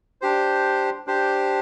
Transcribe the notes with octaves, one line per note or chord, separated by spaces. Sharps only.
D4 G4 C5
D4 G4 C5